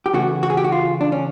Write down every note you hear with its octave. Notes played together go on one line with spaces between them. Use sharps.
G4
C#3 E3 A3 F#4
F#4
G#4
G4
F#4
F4
D4
C#4